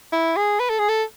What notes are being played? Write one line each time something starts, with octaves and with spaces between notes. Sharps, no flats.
E4
G#4
B4
A4
G#4
A4